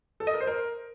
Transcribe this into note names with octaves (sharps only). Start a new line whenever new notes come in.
A4
D#5
A#4
C5
A#4